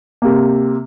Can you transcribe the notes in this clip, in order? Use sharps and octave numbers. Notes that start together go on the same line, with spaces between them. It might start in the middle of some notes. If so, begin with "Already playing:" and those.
C3 A#3